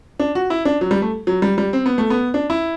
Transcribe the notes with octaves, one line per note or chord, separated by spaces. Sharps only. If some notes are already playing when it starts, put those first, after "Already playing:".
D4
F#4
E4
D4
F#3
G3
A3
F#3
G3
G3
C4
B3
A3
B3
D4
E4